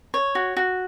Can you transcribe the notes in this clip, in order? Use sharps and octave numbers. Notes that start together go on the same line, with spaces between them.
C#5
F#4
F#4